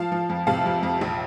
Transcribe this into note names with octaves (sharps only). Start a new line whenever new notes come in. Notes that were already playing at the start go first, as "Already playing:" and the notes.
Already playing: F3 F5 A5
F3
F2
C3 F5 A5
F2
F2
A#1